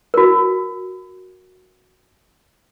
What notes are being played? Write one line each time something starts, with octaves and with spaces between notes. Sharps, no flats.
F#4 A#4